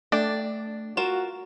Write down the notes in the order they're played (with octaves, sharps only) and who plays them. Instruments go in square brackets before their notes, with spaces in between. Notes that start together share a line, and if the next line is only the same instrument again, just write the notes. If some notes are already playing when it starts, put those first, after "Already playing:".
[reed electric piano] A3 [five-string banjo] D4 G5 [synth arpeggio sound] D5
[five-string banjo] F4 A#4 [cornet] F#4 [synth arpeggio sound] E7